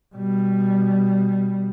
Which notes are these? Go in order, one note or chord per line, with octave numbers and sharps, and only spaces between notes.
B2 G3